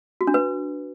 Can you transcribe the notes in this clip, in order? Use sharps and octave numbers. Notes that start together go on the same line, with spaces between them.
F#4
D4
B4